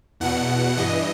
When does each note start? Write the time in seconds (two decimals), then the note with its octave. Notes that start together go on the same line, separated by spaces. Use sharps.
0.20 E2 B2 F#5
0.77 G2 E3 D#5